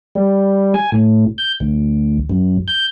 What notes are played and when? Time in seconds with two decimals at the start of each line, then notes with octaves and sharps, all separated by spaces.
0.15 G3
0.74 G#5
0.92 A2
1.38 G6
1.60 D2
2.30 F#2
2.68 G6